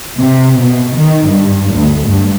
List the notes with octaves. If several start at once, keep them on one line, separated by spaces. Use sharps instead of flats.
C3
B2
D#3
G2
D2
G2